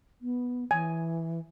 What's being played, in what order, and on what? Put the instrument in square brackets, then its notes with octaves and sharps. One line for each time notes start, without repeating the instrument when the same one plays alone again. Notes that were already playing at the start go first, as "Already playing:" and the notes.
[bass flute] B3
[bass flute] E3 [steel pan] G#5